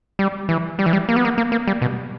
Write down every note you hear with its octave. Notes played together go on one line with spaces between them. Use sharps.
G3
E3
G3
E3
G3
A#3
B3
A#3
A#3
A#3
G3
B2